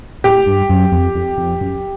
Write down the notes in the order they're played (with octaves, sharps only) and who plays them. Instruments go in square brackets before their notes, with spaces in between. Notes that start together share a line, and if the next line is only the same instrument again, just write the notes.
[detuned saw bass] A2 [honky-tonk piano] G4
[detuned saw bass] G2
F#2
F2
F2
F2
F#2